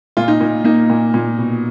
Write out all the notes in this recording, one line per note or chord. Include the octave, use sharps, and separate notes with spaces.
A#2 F4
D#4
A#2
A#3 D#4
A#2
A#2
B2